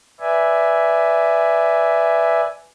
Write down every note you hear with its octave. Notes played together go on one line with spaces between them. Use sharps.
B4 D5 E5 G#5